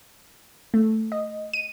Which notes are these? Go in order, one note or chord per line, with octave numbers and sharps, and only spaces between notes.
A3
D#5
D#7